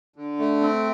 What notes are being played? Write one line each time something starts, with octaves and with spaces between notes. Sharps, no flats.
D3
A3
C4